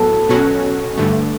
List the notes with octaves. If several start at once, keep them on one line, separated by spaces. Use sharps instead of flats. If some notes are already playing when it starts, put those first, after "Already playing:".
Already playing: A2 F#3 B3 A4
B2 F#3 C#4 F#4
G2 D3 A3